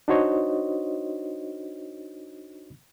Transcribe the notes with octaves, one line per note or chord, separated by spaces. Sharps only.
D4 D#4 F#4 C5 C#5 D#5